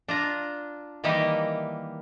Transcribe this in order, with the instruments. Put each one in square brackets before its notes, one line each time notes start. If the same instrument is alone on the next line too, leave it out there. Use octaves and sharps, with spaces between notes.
[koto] D4 F4 A#5
D#3 E3 G3 A#3 D#4 G4